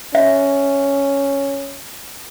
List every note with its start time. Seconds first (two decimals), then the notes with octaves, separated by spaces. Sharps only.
0.15 C#4 E5